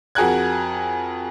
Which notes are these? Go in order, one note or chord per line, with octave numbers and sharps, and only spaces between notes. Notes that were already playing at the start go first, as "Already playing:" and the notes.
F2 F#4 G#4 A#4 F#6 G#6